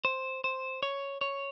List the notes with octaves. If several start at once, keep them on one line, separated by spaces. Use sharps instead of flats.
C5
C5
C#5
C#5